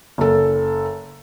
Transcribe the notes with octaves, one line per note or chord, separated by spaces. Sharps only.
F#1 A4